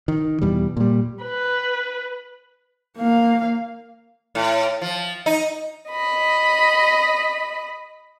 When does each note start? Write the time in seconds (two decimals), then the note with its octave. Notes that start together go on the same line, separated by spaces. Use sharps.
0.08 D#3
0.42 E2 B2 G3
0.77 A#2 G3
1.24 B4
2.98 A#3 F5
4.35 A2
4.82 F3
5.26 D#4
5.89 D#5 B5